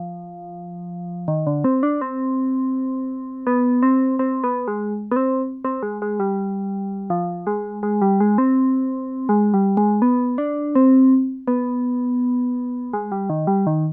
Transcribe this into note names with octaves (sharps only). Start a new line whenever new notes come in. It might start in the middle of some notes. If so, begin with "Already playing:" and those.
Already playing: F3
D#3
D3
C4
D4
C4
B3
C4
C4
B3
G#3
B3
C4
C4
G#3
G#3
G3
F3
G#3
G#3
G3
G#3
C4
G#3
G3
G#3
B3
D4
C4
B3
G#3
G3
D#3
G3
D#3